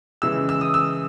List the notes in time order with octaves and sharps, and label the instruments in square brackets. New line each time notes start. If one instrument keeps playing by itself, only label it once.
[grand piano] C#3 E3 G#3 E6
E6
D#6
E6